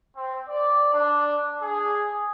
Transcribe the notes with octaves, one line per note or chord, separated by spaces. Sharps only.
C4
D5
D4
G#4